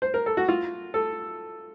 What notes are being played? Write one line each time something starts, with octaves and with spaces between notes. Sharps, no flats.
C5
A#4
A4
F#4
F4
A4